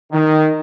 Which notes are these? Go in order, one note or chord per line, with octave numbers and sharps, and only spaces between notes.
D#3